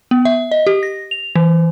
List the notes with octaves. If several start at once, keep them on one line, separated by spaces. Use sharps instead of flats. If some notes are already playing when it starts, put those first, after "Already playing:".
B3
E5
D#5
G4
A#6
F7
E3